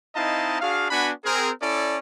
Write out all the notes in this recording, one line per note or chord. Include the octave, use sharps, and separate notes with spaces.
C4 D#4 E4 D#5 F5 A5
D4 F#4 G#4 F5
B3 D4 F#4 F#5 G#5 B5
C4 G#4 A#4
C#4 E4 A4 D5